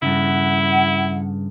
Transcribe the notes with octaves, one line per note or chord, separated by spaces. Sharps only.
G2 A#2 C#3 E4 F#5